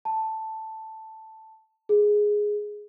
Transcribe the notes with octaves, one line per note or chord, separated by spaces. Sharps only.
A5
G#4